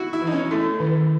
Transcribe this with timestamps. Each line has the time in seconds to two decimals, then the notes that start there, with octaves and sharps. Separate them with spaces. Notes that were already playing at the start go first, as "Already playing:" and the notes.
Already playing: E4 F#4
0.13 E4
0.22 E3
0.27 D#4
0.32 C#4
0.51 A3 E4
0.80 D#3